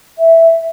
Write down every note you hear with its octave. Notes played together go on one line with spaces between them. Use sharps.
E5